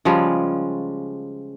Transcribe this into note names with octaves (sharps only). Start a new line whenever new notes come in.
C#3 F3 G3 G#3